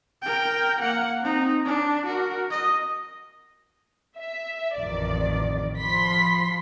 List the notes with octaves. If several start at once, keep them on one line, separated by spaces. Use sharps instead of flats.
A#4 G5
A#3 F#5
C4 D#4
D4
F#4 A#4
D#5
E5
A1 F2 D#3 D5
F3 B5 C6 B6